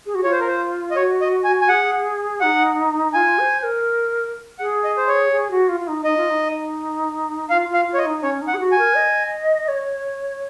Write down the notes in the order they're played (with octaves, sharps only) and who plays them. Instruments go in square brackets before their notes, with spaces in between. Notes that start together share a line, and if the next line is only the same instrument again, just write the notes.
[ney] G#4
F#4
[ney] F4 [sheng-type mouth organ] C#5
[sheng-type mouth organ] C5
A#4
C5
D#5
[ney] F#4 [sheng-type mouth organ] C#5
[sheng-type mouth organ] D#5
G#5
G#5
[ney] G#4 [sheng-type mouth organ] F#5
[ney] D#4 [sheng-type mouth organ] F#5
[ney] F4 [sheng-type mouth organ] G#5
[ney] C5
A#4
[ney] G#4 [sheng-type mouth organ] F#5
[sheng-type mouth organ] D#5
C5
C#5
[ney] G#4
F#4
F4
F4
D#4
[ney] D#4 [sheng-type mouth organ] D#5
[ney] F4
D#4
[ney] F4 [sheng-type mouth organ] F5
[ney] F4
[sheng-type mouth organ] F5
[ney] F4
[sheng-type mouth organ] C#5
D#5
[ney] D#4
[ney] C#4 [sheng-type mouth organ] C#5
[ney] D#4
[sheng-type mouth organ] F#5
[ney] G#4
F#4
[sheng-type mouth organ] G#5
[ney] A#4
D#5
C#5